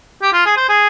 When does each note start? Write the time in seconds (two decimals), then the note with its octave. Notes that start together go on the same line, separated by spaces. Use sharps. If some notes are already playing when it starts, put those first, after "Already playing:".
0.22 G4
0.33 F4
0.45 G#4
0.57 C5
0.69 G#4